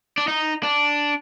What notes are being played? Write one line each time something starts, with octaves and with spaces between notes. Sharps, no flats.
D4
D#4
D4